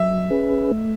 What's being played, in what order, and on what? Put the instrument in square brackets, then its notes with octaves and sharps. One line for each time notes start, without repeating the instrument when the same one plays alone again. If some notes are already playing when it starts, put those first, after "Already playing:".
Already playing: [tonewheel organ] F#3 [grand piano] E5
[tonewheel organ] C#4 G#4 B4
A3